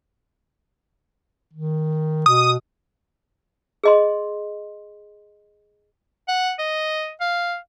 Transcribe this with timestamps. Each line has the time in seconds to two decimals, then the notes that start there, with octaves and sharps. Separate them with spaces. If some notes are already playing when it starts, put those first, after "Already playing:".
1.53 D#3
2.26 B2 D#6
3.84 G#4 D#5 C6
6.28 F#5
6.59 D#5
7.20 F5